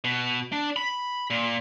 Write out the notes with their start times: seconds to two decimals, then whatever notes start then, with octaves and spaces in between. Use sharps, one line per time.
0.04 B2
0.53 D4
0.76 B5
1.30 A#2